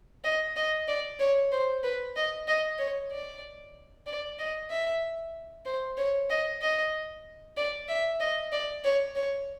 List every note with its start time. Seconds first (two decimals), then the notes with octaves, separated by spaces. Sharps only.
0.24 D#5
0.56 D#5
0.88 D5
1.20 C#5
1.52 C5
1.84 B4
2.16 D#5
2.48 D#5
2.79 C#5
3.12 D5
4.06 D5
4.39 D#5
4.70 E5
5.66 C5
5.98 C#5
6.30 D#5
6.62 D#5
7.57 D5
7.89 E5
8.20 D#5
8.52 D5
8.84 C#5
9.16 C#5